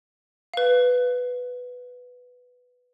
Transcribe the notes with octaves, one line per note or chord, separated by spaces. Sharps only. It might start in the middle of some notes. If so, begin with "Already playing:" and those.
B4 F5